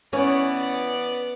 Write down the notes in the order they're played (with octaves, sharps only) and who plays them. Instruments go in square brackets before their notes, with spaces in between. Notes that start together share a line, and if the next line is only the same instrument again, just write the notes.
[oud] E3 C#4 [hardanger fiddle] B3 D5